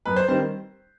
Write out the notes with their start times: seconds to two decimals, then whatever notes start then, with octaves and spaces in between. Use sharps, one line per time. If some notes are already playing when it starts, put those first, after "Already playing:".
0.05 F#2 B4
0.16 C5
0.28 D#3 G3 C4 C5